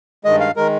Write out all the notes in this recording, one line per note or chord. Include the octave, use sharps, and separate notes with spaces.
G2 D#3 G#3 D#5
F5
D#3 G#3 A#4